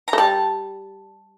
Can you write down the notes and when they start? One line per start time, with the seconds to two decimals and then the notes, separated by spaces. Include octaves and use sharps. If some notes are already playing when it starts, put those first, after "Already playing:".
0.08 A#5
0.13 A3
0.18 G3 A5